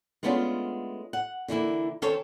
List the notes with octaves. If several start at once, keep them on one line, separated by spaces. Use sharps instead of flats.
G#3 A3 B3 C#4 D4 F4
F#5
D3 E3 A#3 E4
D#3 C4 C#4 A4 C5 C#5